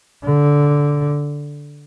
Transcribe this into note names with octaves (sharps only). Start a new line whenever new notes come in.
D3